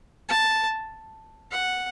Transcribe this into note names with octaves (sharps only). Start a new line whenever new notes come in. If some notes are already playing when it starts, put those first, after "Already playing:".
A5
F#5